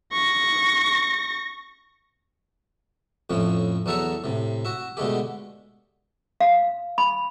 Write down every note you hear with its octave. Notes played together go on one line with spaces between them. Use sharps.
C#6 A#6
F2 A2 F3 C#4
E2 F#3 A4 E5 A#5 C#6
A2 C3
F#4 E5
B2 D3 G#3 A3 G4
F5
B5